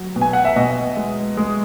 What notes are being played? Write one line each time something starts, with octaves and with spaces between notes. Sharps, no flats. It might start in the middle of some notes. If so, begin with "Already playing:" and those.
Already playing: F#3
B2
G#5
F#5
E5
B2 D#5
G#3
G#3